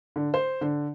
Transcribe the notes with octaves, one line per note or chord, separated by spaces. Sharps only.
D3
C5
D3